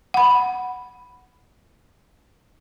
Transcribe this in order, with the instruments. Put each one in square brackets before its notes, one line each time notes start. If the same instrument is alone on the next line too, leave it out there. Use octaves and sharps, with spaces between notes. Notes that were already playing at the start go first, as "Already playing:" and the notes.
[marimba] F#5 B5